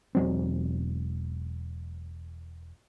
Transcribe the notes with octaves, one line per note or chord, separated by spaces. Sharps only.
E1 F#3 C4